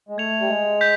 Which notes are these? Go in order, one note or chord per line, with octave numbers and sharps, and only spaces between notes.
G#3
A3 G#6 C#7 F7
G3
G#3
G6 B6